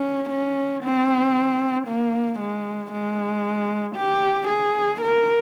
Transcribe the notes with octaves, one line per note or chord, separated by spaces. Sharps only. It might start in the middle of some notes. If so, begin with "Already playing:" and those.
Already playing: C#4
C#4
C4
A#3
G#3
G#3
G4
G#4
A#4